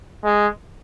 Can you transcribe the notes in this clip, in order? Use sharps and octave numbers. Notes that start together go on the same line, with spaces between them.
G#3